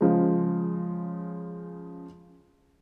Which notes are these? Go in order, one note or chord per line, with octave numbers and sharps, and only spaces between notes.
C#3 F3 G#3